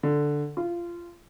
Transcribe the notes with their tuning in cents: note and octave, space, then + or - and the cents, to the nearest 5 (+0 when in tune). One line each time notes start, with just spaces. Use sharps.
D3 +0
F4 -20